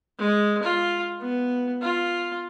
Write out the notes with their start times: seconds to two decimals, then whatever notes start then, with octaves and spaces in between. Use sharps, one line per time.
0.19 G#3
0.63 F4
1.20 B3
1.82 F4